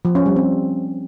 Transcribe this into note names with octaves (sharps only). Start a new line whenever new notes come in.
F3
C#4
G3
C4